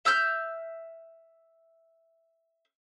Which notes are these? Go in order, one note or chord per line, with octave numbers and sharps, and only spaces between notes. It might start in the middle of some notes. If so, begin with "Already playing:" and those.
E5 E6 F6 G6